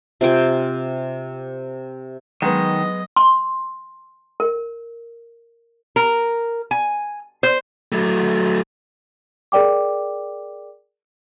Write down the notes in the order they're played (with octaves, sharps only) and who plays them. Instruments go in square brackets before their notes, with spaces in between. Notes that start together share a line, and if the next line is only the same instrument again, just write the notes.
[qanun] C3 F4 G5 G#5
[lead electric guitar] D#3 [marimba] F#3 [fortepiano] G#3 B3 [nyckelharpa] D#5
[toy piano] C6
A#4
[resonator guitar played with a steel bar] A#4
G#5
C5
[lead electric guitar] F#3 A3
[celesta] G#4 A#4 D5 G5 D6